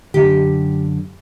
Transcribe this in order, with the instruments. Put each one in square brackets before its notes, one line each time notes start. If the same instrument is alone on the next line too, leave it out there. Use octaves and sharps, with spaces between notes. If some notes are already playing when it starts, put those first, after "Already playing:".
[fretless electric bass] F#2 D3 [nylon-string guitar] G4